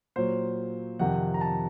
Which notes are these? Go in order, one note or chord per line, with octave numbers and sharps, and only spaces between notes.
A#2 F#3 C5
F2 C3 D#3 F#5
A#5
A5